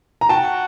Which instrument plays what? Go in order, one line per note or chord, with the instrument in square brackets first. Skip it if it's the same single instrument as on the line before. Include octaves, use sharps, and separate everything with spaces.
[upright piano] A#5
[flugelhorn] F#4 [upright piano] G5 A5